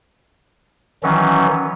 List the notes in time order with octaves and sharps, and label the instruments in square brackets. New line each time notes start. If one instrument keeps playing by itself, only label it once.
[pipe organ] D#3 E3 F#3 C#4